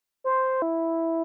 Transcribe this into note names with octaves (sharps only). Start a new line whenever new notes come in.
C5
E4